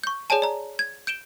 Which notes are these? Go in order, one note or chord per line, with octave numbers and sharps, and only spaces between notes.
C#6 G6
G#4 C#5 D5 G#5 A5
D5 A#5
G#6
G6 D7 E7 G7